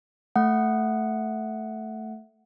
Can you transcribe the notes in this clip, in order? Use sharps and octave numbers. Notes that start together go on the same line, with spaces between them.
A3 F#5